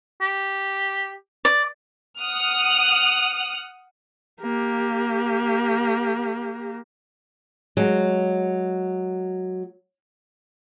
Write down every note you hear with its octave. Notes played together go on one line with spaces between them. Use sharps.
G4
D5
F#5 D#6 F6 F#6
A#3 G4
F#3 G#3